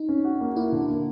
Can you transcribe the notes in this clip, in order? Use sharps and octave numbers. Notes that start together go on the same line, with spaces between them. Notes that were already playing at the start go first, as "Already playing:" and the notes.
Already playing: D#4
C#4
F#4
A#3
A#3 E4
D3
A#3